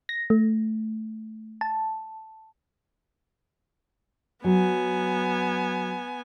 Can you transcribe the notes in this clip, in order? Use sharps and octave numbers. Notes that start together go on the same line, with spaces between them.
A#6
A3
A5
F#3 B3 G#5